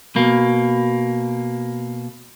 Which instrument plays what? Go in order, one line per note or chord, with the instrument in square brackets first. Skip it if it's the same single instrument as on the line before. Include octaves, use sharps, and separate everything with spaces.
[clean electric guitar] B2 A#3